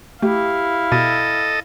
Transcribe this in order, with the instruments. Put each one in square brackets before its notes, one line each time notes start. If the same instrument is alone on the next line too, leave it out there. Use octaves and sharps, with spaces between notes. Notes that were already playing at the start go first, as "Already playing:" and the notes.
[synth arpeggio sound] A3 [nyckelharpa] E4 F5 [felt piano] G4
[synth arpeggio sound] B2 [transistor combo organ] A4 D#5